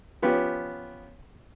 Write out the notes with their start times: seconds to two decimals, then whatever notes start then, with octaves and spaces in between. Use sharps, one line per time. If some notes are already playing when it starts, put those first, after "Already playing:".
0.22 F3 B3 C#4 G4